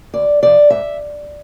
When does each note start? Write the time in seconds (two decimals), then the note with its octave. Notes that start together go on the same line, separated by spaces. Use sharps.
0.14 D2 D5
0.42 C3 F3 D5
0.70 G#2 E5